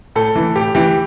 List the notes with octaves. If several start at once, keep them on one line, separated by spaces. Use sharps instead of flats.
A2 A4
E3
A2 G4
E3 G4